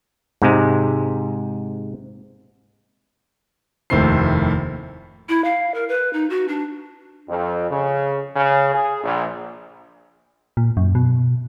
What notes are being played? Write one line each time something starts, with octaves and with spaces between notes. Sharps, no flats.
G#2 C3 G#3
F1 D#2 A2 C3 C5 C7
E4
F5
A#4
B4
D#4
F#4
D4
F2
C#3
C#3
G#4
A#1
A#2
F#2
B2